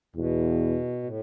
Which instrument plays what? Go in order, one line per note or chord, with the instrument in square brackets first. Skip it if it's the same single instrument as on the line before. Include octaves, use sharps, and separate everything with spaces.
[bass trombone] E2 [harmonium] B2
[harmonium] A2